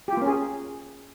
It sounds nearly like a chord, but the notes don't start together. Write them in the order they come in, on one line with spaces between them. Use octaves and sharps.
G4 F4 A#3 C#4 G#4